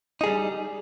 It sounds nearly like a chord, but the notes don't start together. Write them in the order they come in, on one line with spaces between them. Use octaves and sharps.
D#4 G#4 G3